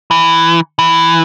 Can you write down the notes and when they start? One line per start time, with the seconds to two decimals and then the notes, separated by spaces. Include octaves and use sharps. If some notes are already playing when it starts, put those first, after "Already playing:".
0.11 E3
0.79 E3